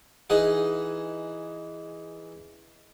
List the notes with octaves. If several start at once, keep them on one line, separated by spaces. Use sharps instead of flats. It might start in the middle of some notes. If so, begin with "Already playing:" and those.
E3 D#4 G#4 F#5